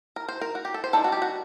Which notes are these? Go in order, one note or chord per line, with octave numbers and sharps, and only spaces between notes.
A#4
C5
A#4
F#4
G4
A4
C5
D#3 G3 D4 A4
F#4
G4
F#4